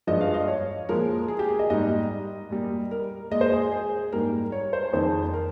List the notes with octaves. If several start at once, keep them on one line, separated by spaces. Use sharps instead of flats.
G2 F3 G#3 D#5
F5
D#5
C#5
A#2 F3 G#3 A#4
G#4
G4
G#4
D#5
G#2 G3 A#3 D#5
A#2 G3 A#3
A#4
A#2 G#3 D#5
C5
G#4
G#4
G#2 G3 A#3 A#4
C#5
C5
F2 D#3 G#3 C5
A#4